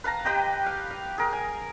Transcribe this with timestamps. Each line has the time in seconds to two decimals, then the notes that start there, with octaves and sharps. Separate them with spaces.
0.04 B4 F5 A5 A#5
0.25 G4 B4 D#5 G5
0.66 F5
0.91 F5
1.18 G#4 A#4
1.33 G#5